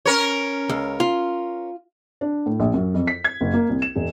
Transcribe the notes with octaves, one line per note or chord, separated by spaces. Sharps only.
C#4 A#4 C#5
C#2
F4
D4
A2
A#1
F#2
F2
B6
G#6
F#1
A#3
C2
E7
E1